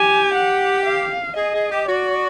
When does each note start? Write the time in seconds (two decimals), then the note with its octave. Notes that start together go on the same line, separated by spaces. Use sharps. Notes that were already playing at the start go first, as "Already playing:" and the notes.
Already playing: G4 G#5
0.34 F#5
0.86 F5
1.37 G#4 D#5
1.54 G#4
1.71 G4
1.88 F#4 D5